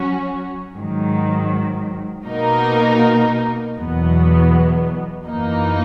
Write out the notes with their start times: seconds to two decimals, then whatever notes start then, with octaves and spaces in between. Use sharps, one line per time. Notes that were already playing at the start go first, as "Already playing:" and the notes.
Already playing: F#3 C#4 F#4
0.75 G#2 D#3 F#3
2.26 B2 A#3 D#4 A#4
3.76 E2 B2 F#3 B3
5.26 F#2 E3 A#3 D#4